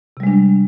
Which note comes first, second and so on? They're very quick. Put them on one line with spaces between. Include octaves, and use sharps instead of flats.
C3 G3 G#3 D4